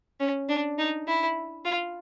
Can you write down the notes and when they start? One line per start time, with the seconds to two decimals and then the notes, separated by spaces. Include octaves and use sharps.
0.20 C#4
0.49 D4
0.78 D#4
1.07 E4
1.65 F4